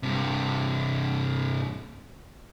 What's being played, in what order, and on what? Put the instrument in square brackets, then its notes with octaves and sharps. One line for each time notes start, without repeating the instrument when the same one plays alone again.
[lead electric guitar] G2 C3